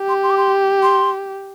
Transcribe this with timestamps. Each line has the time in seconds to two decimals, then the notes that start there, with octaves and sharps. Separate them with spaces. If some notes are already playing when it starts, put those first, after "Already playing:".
Already playing: G4
0.09 C6
0.23 C6
0.30 D6
0.38 C6
0.83 C6